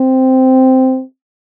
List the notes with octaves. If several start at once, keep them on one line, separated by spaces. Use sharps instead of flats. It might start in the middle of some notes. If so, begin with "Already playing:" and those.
Already playing: C4